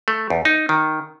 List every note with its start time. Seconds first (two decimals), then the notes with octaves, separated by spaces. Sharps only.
0.08 A3
0.30 E2
0.45 D#4
0.69 D#3